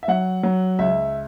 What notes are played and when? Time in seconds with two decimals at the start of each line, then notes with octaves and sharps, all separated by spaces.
0.03 E5
0.08 F#3 F#5
0.43 F#3
0.79 C#2 E5